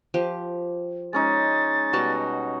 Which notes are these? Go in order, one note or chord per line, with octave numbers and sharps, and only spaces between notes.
F3 G4
G#3 C#4 D#4 A6
B2 G3 F#4 A5